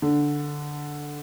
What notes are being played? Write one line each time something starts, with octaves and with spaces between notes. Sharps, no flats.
D3